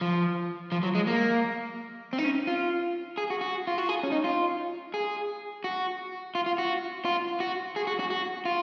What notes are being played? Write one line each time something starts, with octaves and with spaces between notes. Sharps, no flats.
F3
F3
F#3
G#3
A#3
C4
D#4
C#4
F4
G#4
F#4
F#4
F4
F#4
G#4
C#4
D#4
F4
G#4
F#4
F4
F4
F#4
F4
F#4
G#4
F#4
F#4
F#4
F4